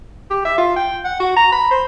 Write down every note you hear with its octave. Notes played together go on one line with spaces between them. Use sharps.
G4
E5
F4
G5
F#5
F#4
A#5
B5
C5